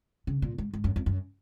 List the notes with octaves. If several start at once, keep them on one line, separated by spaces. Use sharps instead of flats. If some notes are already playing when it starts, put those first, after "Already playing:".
C#3
A#2
G#2
G#2
F#2
F2
F#2